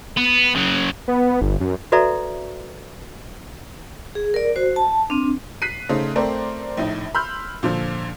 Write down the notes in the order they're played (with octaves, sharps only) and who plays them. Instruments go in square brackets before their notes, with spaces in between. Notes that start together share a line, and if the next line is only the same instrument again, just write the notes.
[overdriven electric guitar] B3
C#3 F#3
[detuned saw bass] B3
G1
F#2
[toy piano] F#4 A4 B4 D5 E5 A#5
[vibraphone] G#4
A#4 D5
F#4 C5
A5
C4 D4
[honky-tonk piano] F#6 B6 C7 D#7
C#3 A3 D#4 C5
A3 C4 A#4 C5 D5
A#1 A2 D#4
B5 C6 E6 F6 G6
A#2 D3 F3